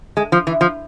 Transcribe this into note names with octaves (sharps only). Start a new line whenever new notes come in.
G#3
F3
E3
F3